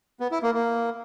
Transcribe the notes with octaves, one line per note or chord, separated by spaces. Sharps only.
B3
E4
A#3
A#3